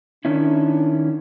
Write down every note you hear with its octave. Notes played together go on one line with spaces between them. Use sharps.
D#3 C#4 D4 E4